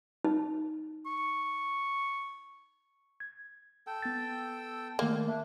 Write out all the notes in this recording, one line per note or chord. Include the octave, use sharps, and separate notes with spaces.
D#4
C#6
G#6
A4 G5 E6
B3 A6
D#3 A3 A#3
D4 E5